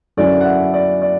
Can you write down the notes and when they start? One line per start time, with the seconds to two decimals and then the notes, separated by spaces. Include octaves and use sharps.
0.17 F#2 D3 F#3 C#4 E4 D5
0.41 F#5
0.45 E5
0.74 D5
1.02 D5